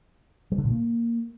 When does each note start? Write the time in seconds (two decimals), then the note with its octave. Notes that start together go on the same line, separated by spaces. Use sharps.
0.52 G3
0.58 D3
0.65 A#2
0.71 A#3